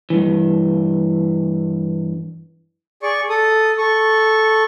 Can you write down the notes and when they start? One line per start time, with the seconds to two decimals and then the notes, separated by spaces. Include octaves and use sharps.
0.10 G2 E3
3.03 G#4 D5 C#6
3.30 A4 D#6
3.78 A4 C#6